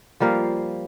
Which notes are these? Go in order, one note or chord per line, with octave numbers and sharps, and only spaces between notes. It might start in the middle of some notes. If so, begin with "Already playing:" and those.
F3 G3 A#3 F5